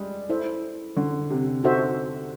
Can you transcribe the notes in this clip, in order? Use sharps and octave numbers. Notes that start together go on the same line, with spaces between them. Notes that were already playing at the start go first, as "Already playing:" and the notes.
Already playing: G3 G#3
E4 A4 C5 E5
D3
C3
D#4 F#4 A4 C5 E5